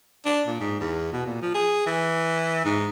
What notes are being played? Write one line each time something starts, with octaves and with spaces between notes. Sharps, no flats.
D4
A#2
G#2
E2
B2
A#2
F3
G#4
E3
G#2